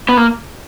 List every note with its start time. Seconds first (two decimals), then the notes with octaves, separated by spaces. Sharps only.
0.09 B3
0.17 A#3